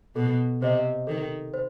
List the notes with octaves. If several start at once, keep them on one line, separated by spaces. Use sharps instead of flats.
B2 A4
C3 C5 D#5
D#3 A4
C5